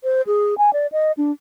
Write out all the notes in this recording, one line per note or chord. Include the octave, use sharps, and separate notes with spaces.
C5
G#4
G#5
D5
D#5
D4